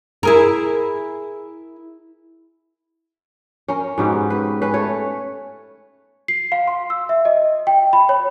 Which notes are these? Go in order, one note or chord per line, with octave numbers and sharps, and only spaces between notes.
E4 G#4 A#4
C#4 A#4
G#2 B2 G4
B4
C#4 B4
A3 C#5
C7
F5
C6
E6
E5
D#5
G5
B5
C#5